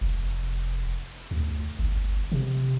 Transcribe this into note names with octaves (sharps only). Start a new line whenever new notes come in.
F1
D2
G1
C3